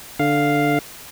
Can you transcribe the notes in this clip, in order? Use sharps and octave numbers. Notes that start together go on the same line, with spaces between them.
D3 F5